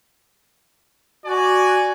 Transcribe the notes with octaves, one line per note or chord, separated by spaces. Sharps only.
F#4 D5 G#5